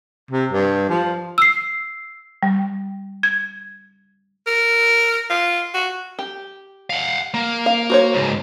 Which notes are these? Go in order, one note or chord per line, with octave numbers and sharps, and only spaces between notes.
C3
G2
F3
E6 C7
G3
G#6
A#4
F4
F#4
G4
F5 F#5
A#3
F5
F#4 C5 C#5
C#2 G#2